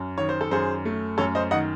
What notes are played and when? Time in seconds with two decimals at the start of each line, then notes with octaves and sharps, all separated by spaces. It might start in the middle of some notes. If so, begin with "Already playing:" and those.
Already playing: F#2
0.18 D#3 C#5
0.29 C5
0.41 A4
0.51 F#2 G#4 C5
0.85 A3
1.18 F#2 A4 C#5
1.35 C5 D#5
1.51 D#3 D#5 F#5